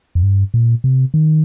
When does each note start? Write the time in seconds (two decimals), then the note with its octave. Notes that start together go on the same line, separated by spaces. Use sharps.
0.15 F2
0.23 G2
0.54 A#2
0.84 C3
1.14 D#3